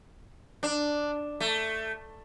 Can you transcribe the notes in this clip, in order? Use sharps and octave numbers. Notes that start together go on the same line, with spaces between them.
D4
A3